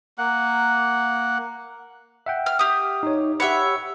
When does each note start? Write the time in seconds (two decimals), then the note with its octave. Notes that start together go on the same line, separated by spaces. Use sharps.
0.18 A#3 F#5
2.26 E5 F#5 G5
2.46 F6
2.59 G4 D#6
3.03 D#4 C#5
3.40 G4 C#5 E5 F#5 B5